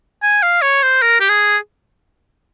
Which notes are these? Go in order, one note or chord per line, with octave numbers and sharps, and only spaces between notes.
G#5
F5
C#5
C5
A#4
G4
G#4